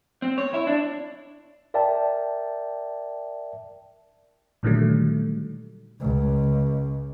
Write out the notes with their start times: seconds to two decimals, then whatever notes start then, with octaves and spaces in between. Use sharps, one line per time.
0.22 C4
0.38 C#5
0.54 E4
0.67 D4
1.74 A#4 D5 E5 G5 A5
4.63 A#2 D3 D#3 F#3 G3 A3
6.00 C#2